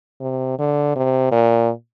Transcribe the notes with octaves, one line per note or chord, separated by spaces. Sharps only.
C3
D3
C3
A#2